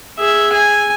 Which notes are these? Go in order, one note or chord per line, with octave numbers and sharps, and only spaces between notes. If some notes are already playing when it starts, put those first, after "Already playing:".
G#4 E5
G#5